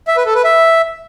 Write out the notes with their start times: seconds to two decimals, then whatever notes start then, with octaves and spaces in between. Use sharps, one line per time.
0.08 E5
0.17 B4
0.26 A4
0.35 B4
0.44 E5